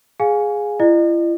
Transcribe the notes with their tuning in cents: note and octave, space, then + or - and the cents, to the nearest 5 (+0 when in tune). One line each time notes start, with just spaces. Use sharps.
G#4 +0 F5 +25 G#5 +0
E4 +45 D#5 -45